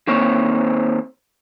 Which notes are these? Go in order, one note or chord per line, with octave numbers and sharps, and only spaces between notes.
D#3 A#3 C4 C5 C#5